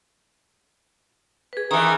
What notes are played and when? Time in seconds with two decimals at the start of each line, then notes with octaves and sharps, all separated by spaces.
1.53 G#4 B4
1.71 D#3 E3 A#5 D#6